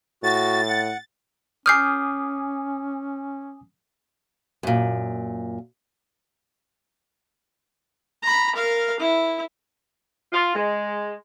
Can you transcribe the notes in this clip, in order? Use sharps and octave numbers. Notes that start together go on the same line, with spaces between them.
A2 F#4 A6
F#5
C#4 G#5 D6 D#6 F6 G6 C7
F#2 A#2
A#5 B5
A#4 F5
E4
F4
G#3